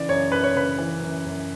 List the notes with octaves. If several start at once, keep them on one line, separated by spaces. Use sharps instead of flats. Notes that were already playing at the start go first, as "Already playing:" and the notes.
Already playing: C#3 E3 D5
F#2 C#5
F#2 B4
C#5
C#3 B4
E3
F#2
F#2